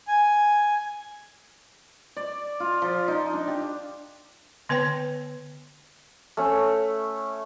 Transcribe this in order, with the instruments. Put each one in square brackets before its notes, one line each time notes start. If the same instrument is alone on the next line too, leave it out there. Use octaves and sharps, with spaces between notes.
[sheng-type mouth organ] G#5
[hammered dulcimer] D5
F4
F3
D#4
D4
G4
[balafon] D3 B3 B4 C#5 G5
[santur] A3 C#4 C#5